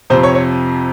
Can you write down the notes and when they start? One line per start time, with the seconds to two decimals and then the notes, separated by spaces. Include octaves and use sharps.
0.10 F2 C3 F3 C5
0.23 C#5
0.35 C#5